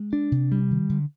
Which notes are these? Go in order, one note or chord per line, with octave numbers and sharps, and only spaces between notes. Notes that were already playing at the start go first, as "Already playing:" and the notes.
Already playing: G#3
D4
C3
G3
D#3
D3